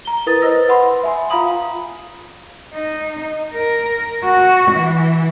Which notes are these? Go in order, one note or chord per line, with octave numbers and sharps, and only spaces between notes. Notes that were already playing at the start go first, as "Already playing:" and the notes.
A#5 G7
E4 A#4 B4 D#6 A6
B4 C5 D#5 D#6 E6 A#6
B4 F#5 B5 C6
E5 G#5 C6
F4 F5 A#5 B5 D#6 F#7
D#4
A#4
F#4
E3